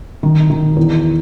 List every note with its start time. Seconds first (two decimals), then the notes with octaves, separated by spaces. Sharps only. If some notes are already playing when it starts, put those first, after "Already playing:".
0.23 D#3
0.50 D#3
0.77 E2